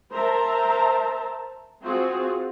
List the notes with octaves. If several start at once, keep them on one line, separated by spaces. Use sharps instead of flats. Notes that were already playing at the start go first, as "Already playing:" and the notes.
A#4 C5 E5 A5 A#5
C4 F4 F#4 G#4